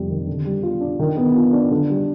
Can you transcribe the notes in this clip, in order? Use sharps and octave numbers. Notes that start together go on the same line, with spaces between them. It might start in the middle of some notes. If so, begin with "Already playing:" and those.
Already playing: F2 C3 G3
D#3
D3
G3
F4
D4
D#3
B3
F4
D4
D3
G3